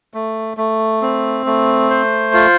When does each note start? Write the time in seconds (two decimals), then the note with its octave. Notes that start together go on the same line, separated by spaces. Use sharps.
0.14 A3
0.57 A3
1.02 C4
1.46 A3
1.90 C5
2.34 F4